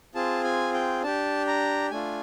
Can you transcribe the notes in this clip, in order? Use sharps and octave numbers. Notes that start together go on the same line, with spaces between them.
C4 F4 G#4 A5
G#5
G5
D4 G4 A5
A#5
A3 D4 F4 G#5